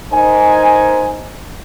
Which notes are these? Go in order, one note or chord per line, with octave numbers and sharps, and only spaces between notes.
D#4 A#4 C5 D#5 G#5